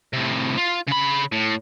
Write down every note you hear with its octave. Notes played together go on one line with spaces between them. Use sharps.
A2 C3
F4
C#3 B5
A2